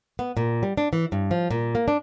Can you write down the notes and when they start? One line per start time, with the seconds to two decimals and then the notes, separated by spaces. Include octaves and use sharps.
0.19 B3
0.37 A#2
0.63 G3
0.77 D4
0.93 E3
1.12 G2
1.31 F3
1.51 A#2
1.75 A#3
1.88 D4